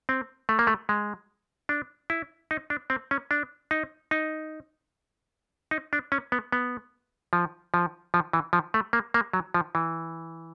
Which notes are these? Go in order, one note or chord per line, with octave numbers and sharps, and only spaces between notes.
C4
A3
A#3
A3
G#3
D4
E4
D#4
D4
C4
C#4
D4
D#4
D#4
D#4
D4
C#4
B3
B3
F3
F3
F3
E3
F3
A3
A#3
A#3
F#3
F3
E3